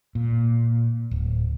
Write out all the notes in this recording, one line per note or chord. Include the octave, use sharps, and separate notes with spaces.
A#2
D1